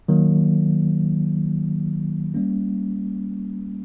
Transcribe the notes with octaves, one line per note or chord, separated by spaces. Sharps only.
D#3 F#3 A#3
G3 A#3 C#4